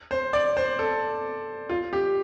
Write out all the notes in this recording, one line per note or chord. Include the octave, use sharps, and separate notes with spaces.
C5
D5
C5
A4
F4
G4